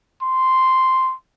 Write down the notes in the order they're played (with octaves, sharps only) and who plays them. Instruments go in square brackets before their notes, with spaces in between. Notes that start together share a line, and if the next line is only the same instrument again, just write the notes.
[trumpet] C6